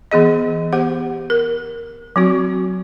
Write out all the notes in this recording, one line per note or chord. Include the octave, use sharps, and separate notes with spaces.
E3 B3 G#4 D#5
B3 G4 C5 F#5
A#4
F#3 C4 F#4